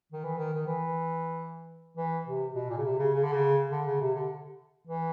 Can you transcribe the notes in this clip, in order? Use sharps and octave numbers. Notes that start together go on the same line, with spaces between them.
D#3
E3
D#3
D#3
E3
E3
C3
B2
A#2
C#3
C3
C#3
C#3
D3
C#3
D3
C#3
C3
D3
E3